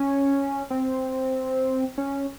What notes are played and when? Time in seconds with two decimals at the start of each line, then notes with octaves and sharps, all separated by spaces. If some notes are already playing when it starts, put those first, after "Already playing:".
Already playing: C#4
0.70 C4
1.98 C#4